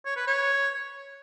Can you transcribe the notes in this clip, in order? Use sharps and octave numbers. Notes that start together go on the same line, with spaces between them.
C#5
B4
C#5